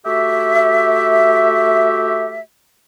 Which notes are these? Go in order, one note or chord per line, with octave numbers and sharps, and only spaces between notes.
A3 F#4 G4 E5